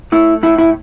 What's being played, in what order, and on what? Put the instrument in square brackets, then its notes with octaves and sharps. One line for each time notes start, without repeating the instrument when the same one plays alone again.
[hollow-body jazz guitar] A3 E4
A2 E4
E4